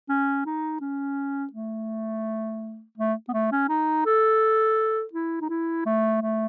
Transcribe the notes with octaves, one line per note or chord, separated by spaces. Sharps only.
C#4
D#4
C#4
A3
A3
B3
A3
C#4
D#4
A4
E4
D#4
E4
A3
A3